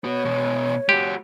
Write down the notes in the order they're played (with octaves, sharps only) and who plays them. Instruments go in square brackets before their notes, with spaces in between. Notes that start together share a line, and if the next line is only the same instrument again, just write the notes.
[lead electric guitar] B3 F#4 [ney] C#5
[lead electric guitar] B2 G#3
[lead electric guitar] G#3 F#4 [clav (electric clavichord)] G4